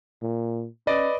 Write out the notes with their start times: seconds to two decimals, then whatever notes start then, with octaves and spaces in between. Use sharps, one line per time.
0.22 A#2
0.87 C#4 B4 D5 D#5